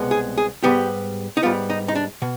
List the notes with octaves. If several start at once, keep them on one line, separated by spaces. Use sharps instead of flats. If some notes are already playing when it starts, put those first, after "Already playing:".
Already playing: C2 B2 G#3 B3
G#4
G#4
G#2 G3 B3 G4
D#4
G#2 G3 B3 F4
D#4
D#4
D4
B2